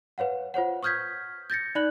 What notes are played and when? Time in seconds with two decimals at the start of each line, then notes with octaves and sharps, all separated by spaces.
0.18 B4 C#5 F5 F#5
0.54 F4 C5 C#5 F#5
0.83 C#6 D#6 F6 G6 G#6 B6
1.50 G6 A6 A#6 C#7
1.75 D#4 D5 B5 F#6 F#7